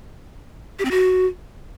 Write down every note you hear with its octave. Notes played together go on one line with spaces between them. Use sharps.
G4
C4
F#4